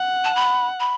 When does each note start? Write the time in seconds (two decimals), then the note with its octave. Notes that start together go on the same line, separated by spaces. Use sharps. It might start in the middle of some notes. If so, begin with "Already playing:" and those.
Already playing: F#5
0.24 A5
0.35 B5
0.80 B5